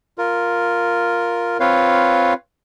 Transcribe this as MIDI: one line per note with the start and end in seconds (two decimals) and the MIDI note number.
0.18 1.57 65
0.18 1.57 70
1.60 2.33 60
1.60 2.33 65
1.60 2.33 71
1.60 2.33 73
1.60 2.33 77